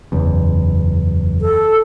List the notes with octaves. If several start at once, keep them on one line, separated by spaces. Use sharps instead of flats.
F#1 E2
A4